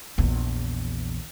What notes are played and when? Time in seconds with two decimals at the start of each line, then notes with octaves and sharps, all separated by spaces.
0.18 A#1 E2